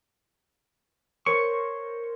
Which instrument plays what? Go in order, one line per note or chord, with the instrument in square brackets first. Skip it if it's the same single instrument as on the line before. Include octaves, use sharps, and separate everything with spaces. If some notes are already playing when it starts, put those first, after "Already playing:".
[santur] A#4 C5 C#5 [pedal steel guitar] C#6